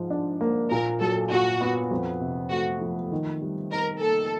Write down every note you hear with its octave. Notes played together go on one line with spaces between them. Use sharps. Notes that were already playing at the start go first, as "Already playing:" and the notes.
Already playing: G#2 F3
D4
A#3
A#2 A#4
F#3 A4
A#2 F#4
B3
F2
C3
A3 F#4
F3
D#3
G3
D#4 A#4
A#3 A4